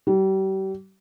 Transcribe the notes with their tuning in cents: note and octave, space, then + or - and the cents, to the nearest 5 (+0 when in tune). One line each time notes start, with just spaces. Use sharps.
G3 -35